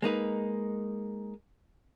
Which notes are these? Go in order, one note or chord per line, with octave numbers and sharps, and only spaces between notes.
G#3 A#3 D#4 B4